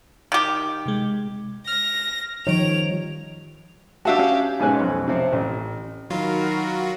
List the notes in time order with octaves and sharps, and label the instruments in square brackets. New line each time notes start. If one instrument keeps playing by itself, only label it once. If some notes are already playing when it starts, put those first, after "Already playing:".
[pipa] D#3 G4
[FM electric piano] C3 G#3
[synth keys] F6 [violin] A#6
[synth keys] D#3 D7 [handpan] F3 G3 C#5 [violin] F7
[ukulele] D4 F5 A5 [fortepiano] F#4 E5 [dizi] G4
[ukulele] C#4 F5
[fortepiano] G#2 B2 G#3 C#4 G#5 F#6
B1 F2
C3 F3 C4 C5
A1
[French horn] D#3 [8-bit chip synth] F#3 F4 [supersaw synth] F#4 [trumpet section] A#4 F5 B5